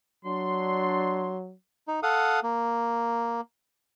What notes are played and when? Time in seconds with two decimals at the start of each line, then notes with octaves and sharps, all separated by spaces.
0.25 F#3 D4 C6
1.88 D#4
2.03 A4 F5 F#5 D#6
2.43 A#3